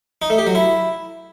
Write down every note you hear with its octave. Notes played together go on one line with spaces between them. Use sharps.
D#4
A3
G4
F#3
E4